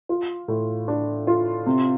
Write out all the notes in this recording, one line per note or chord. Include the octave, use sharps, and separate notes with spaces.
F4
A2
D4
F4
C3